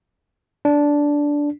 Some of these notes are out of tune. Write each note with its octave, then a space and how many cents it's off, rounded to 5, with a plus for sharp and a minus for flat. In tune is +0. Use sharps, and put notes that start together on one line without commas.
D4 -10